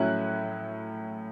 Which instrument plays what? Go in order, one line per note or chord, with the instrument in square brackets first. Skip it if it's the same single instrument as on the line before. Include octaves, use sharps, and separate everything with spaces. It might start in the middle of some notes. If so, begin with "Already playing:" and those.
Already playing: [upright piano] A2 F#3 C#4 E4 F#6